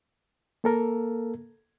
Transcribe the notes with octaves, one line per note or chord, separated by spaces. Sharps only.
A#3 A4 A#4